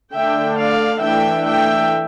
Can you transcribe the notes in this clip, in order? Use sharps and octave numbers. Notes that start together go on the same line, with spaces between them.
D3 A3 D4 E5 G5
D5 F5
E3 A3 D4 E5 G5
E5 G5